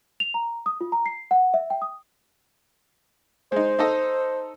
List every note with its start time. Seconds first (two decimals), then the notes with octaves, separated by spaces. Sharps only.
0.20 F7
0.34 A#5
0.66 D#6
0.81 F4
0.92 A#5
1.06 C7
1.31 F#5
1.54 E5
1.70 G5
1.82 D#6
3.52 G#3 D#4 C5
3.79 D#4 A4 D#5